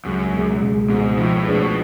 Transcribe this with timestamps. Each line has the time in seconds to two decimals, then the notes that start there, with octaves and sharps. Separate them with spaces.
0.05 C#2 F#2
0.33 B2 G#3
0.61 C#2
0.89 G#2 B2 G#3
1.17 A2 F3
1.36 A2
1.45 G#3 D4 G#4 B4
1.55 B2